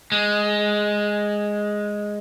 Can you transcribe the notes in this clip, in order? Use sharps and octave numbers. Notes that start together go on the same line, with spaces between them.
G#3